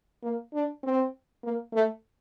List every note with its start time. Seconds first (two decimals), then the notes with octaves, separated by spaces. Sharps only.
0.23 A#3
0.53 D4
0.83 C4
1.44 A#3
1.73 A3